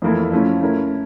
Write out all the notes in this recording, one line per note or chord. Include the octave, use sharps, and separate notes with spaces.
F2 E3 A#3 E4 A4
F3 A3 C#4 E4
A3 C#4 E4 A#4